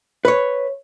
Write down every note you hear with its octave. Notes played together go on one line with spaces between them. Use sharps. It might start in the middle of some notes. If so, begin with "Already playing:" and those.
B4 C#5